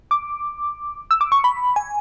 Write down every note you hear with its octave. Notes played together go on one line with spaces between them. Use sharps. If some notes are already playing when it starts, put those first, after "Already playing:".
D6
E6
D6
C#6
B5
G#5